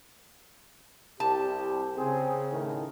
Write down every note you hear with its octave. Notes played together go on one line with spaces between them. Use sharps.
C2 G4 A5
C#3 C4 G#4
A2 D#3